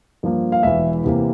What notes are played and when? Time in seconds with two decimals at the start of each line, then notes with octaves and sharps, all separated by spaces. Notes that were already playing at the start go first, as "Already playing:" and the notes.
0.23 G2 F3 A#3
0.52 F5
0.63 E1 E2 E3 E5
1.04 E2 C3 E3 A#3